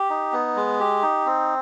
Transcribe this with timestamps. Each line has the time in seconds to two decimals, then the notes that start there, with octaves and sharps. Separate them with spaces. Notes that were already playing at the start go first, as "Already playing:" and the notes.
Already playing: G4
0.10 D#4
0.33 B3
0.56 G#3
0.80 G4
1.02 D#4
1.26 C4